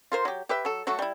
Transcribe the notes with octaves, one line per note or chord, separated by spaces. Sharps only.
F4 A#4 C5
F#3 G4
G4 B4 E5
F#3 A4
F#3 A3 F#4 A4
G3 E4